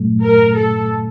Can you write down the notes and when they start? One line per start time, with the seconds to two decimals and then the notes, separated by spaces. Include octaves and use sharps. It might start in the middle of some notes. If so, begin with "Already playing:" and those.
Already playing: C2 A#2 F#3 A3
0.23 A#4
0.55 A4